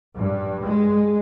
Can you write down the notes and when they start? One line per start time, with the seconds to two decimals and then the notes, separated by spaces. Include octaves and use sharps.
0.16 G2
0.64 G#3